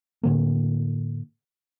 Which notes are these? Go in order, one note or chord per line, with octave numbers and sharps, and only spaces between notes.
A2 D3 A#3